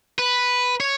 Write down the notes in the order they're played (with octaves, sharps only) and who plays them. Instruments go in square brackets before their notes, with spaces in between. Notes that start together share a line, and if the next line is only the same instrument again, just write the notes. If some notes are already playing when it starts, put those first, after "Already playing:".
[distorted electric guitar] B4
C#5